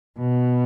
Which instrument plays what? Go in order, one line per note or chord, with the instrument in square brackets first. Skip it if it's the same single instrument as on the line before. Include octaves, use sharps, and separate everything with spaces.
[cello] B2